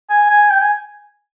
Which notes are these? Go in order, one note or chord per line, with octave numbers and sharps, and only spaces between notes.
G#5
G#5
G5
G#5